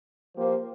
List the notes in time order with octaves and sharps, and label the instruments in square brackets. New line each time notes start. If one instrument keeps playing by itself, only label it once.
[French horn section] F3 A#3 G4 C5